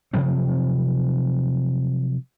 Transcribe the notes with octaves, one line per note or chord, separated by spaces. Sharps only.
C3 F3 F#3 C4